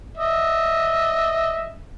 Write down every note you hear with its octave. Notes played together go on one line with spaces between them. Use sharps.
D#5 E5